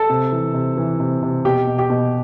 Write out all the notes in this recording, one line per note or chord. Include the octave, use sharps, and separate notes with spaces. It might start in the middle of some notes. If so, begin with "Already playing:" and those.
Already playing: A4 A5
C3
E3
C3
E3
C3
C3
B2 G4 G5
B2
G4 G5
B2